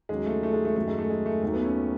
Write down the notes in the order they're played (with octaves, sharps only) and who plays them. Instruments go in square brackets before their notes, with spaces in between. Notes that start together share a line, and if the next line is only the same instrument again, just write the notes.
[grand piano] D#2 C#3 F#3 G#3
A3
A3
G#3
A3
F#2 D#3 F#3 A3
G#3
A3
G#3
A3
D#2 D#3 F#3 A3
B3
C#4